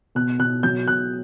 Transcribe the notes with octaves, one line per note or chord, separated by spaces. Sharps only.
B2 F#6
B2 F#6
F#3 G6
B2 F#6